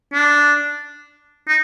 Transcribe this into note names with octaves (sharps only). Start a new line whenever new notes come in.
D4
D#4